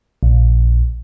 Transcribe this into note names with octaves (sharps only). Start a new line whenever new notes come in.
A#1